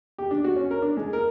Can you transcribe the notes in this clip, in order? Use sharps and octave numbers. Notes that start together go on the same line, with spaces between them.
G4
D4
F#4
C#4
A#4
D4
G#3
A#4